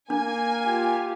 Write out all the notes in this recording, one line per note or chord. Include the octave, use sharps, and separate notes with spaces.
A#3 D4 G#5
F4 G4